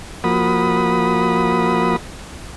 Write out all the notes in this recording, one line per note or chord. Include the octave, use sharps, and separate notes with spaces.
F3 A#3 F#4 B5 D#6